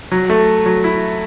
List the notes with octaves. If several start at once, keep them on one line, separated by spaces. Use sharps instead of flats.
F#3
A3
F#3
E4